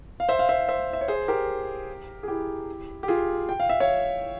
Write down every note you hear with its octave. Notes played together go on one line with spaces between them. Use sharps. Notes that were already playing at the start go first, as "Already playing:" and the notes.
F5
C5 E5
F5
C5 E5
C5 E5
E5
C#5
G#4 C5
G4 A#4
G#4
E4 G4
G4
F4 G#4
G5
F5
E5
C#5 F5